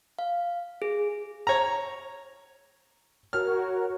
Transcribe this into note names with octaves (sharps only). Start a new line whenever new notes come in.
F5
G#4
C#5 A#5
F#4 A#4 C#5 F6